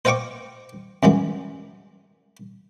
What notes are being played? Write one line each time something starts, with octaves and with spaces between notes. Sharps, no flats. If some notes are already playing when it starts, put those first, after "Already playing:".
C5 D#5 F5 G5 C#6 D6
F#2 E3 F#3 G#3